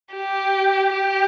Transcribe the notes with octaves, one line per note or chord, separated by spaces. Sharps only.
G4
G4